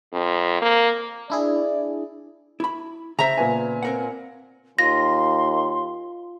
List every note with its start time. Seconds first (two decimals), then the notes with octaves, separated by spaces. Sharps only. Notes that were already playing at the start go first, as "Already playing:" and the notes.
0.13 F2
0.62 A#3
1.30 D4 E4 G#4 D5
2.60 E4 B5
3.19 C#3 C5 E5 A#5
3.38 A#2 B3 G#5
3.83 C4 A#4 F#5
4.79 D#2 F4 C6 A#6